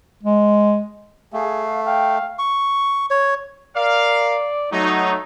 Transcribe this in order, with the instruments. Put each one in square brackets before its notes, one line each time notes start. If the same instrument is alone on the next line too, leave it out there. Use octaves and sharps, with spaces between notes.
[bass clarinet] G#3
[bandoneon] A3 [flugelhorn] G#4 [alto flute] F5
[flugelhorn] F5 [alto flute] G5
[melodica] C#6
C#5
[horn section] A#4 F5 [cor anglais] D5
[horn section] F#3 D#4 [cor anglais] A3